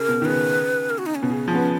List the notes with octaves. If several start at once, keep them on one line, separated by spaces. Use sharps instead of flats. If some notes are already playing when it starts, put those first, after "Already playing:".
Already playing: C#3 A#4
B2
D#3
C#3 B4
A#4
F#4
D#4
C#4
B2
C#3
F3
B3